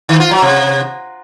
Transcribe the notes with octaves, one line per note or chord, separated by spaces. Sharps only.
D#3
F4
F#3
C3